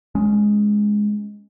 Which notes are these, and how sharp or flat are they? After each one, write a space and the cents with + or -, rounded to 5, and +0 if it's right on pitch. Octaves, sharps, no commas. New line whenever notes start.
G#3 +0 C#4 +0